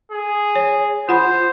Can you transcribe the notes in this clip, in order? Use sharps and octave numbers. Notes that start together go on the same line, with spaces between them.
G#4
C#5
F4 C5 F#5 B5